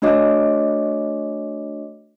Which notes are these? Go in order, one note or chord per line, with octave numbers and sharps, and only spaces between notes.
A3 D4 F#4 C#5 D#5 D6